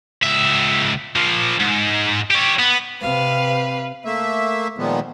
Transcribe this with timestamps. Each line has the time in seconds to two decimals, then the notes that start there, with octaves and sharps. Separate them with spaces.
0.22 C#2 E5
1.16 F3 A#3
1.60 G#2
2.31 G4 C#5
2.59 B3
3.02 C3 B4 F5
4.05 A3 A#3 E5
4.78 A#2 D#3 F3 G#3 B3